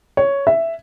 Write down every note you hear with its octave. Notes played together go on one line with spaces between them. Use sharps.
C#5
E5